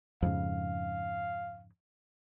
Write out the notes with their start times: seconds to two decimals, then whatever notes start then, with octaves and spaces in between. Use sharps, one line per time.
0.22 F2 G#2 C#3 F5